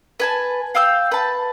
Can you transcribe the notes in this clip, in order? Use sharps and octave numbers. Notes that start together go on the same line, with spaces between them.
B4 G#5 A5
F5 G5 E6 G6
B4 A5